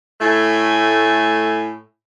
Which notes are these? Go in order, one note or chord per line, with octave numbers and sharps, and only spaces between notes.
A2 A3 G#5